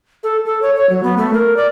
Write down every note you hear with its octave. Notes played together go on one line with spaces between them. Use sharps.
A4
A4
C#5
C#5
F#3
B3
A3
A#4
D5